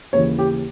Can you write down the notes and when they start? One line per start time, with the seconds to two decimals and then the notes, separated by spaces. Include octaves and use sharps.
0.13 D#2 C#3 E3 C#5
0.39 G4